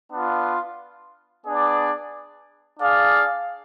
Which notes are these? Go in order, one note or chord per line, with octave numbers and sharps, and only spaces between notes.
B3 D4 F4
B3 D4 G#4 D5
D4 G#4 D5 F5